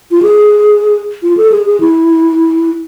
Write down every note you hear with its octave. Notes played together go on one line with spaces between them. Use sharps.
F4
G#4
F4
A4
G#4
G#4
E4